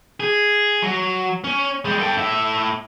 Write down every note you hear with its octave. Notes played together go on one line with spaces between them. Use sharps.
G#4
F#3
C#4
G3 G#3
A4 G5
A2 E5